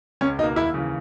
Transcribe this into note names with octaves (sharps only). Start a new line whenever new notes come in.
C#2 C#4
B2 A#3 D#4
D#2 E4
C#3 E3